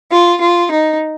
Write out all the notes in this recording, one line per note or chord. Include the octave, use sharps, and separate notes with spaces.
F4
F4
D#4